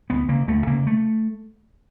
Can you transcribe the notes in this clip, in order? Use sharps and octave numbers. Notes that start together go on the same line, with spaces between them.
D2 B3
C#3 A#3
D2 A3
C#3 A#3
A3